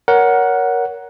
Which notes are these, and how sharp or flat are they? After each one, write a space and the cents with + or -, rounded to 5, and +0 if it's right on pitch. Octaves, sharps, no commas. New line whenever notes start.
A#4 +15 C#5 +25 F#5 +0